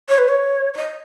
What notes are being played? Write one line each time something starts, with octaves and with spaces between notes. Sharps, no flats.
C#5
B4
C#5
C#5
D#5